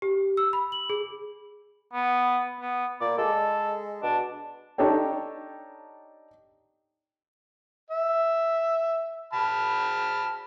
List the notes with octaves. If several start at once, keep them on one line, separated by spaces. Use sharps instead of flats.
G4
E6
B5
F#7
G#4
B3
B3
A#2 D5
G#3 A4
B2 D4
D4 D#4 G4 A4 C#5 G5
E5
A5 B5 F6